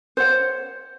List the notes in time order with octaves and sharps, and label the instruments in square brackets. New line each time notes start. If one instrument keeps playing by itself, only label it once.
[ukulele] C5 C#5 F#5